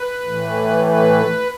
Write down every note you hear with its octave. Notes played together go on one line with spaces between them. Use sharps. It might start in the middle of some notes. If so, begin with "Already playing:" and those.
Already playing: B4
A2 E3 A3
B4